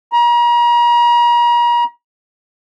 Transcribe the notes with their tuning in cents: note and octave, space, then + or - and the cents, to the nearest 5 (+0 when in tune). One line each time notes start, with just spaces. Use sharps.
A#5 +40